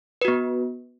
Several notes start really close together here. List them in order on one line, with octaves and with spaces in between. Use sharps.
B4 F#4 B3